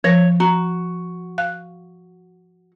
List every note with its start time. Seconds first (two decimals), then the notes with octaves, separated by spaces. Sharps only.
0.04 F3 C#5 A#6
0.40 F#4 A#5
1.38 F5 F#6